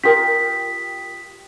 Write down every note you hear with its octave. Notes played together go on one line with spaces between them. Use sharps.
F4 G4 A#4 G5 D#6 B6